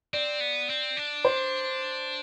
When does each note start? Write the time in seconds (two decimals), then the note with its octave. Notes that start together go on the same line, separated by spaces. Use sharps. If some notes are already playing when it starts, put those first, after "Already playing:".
0.13 C4 D5
0.40 B3
0.70 C4
0.97 D4
1.25 C5